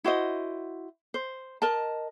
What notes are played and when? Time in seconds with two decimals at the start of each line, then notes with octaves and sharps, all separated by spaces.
0.04 E4 F#4 C5 D#5
1.14 C5
1.62 A#4 D#5 A5